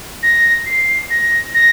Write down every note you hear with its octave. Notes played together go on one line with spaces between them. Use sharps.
A#6
C7
A#6
A#6